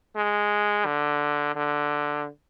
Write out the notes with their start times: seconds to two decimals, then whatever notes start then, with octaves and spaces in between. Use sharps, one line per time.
0.16 G#3
0.85 D3
1.55 D3